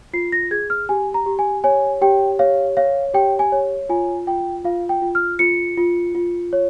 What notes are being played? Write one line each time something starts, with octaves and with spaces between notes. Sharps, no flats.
F4 C7
A#6
G#4 G#6
F6
G4 G#5
A#5
G4
G#5
C#5 G#5
G4 G5
C#5 F5
C#5 F5
G4 G5
G#5
C#5
F4 G#5
F4 G5
F4 F5
G5
F4
F6
F4 C#7
F4
F4
C#5